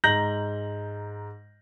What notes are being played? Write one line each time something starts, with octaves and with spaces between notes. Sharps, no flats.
G#2 A#5 G6 A#6 F#7